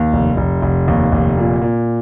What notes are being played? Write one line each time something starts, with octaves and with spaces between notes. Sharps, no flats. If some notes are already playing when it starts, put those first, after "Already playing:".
Already playing: D#2
F1
F1
F1
D#2
F1
A#2
A#2